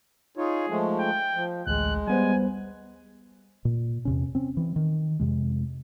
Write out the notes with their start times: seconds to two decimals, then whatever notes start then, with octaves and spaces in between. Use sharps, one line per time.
0.37 D#4 F4 G#4 C#5
0.69 F3 G#3 A3
1.00 G5
1.35 F3
1.67 A1 D2 G#3 F#6
2.08 G3 B3 C5 G#5
3.65 A#2
4.05 E2 C3 C#4
4.35 C4 C#4
4.57 E3 C4
4.76 D#3
5.20 F2 C3 G#3